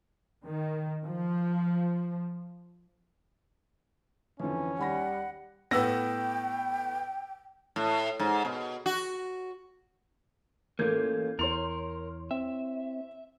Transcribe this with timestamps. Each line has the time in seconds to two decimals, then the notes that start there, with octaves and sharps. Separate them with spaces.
0.44 D#3
1.05 F3
4.40 F2 D3 E3 F3 C#4
4.79 D#2 G3 F#5 B5 A#6
5.71 A2 B3 B4 G5 E6 A#6
7.76 A2
8.19 G#2
8.45 B2
8.86 F#4
10.79 A1 A#3 C#4 F4 A4 A#4 G6 G#6
11.39 E2 E4 A#4 C#5 C6 F7
12.31 C4 E5